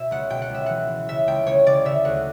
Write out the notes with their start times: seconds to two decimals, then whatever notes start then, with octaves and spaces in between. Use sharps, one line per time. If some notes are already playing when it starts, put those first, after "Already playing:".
Already playing: B2 E5
0.11 C#2 F#5
0.30 B2 G5
0.42 F#5
0.50 C#2 E5
0.66 E3 F#5
0.88 E3
1.09 C#3 E5
1.27 C#2 G5
1.46 C#2 C#5
1.66 C#3 D5
1.85 C#3 E5
2.05 D2 F#5